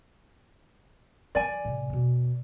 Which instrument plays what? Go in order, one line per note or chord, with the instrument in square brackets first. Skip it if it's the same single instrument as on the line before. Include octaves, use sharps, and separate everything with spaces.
[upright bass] E3 F#3 [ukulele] D5 G#5
[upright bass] A2 C3
E2 B2